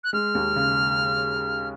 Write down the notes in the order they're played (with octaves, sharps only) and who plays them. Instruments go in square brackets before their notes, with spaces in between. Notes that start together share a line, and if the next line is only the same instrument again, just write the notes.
[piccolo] F#6
[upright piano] G#3 [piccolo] F6
[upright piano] D#2
C#3